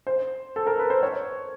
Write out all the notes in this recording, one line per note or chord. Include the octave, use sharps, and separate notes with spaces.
C5
A4
A#4
B4
C5
C#5